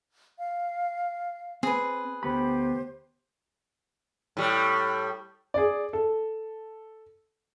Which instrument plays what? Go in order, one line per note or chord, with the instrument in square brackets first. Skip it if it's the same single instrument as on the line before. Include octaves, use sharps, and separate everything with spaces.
[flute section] F5
[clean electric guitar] C4 [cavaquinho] G#4 B4
[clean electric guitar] D2 B3 B5 [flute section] G4 C5
[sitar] A2 G3
[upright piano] G#4 D5
A4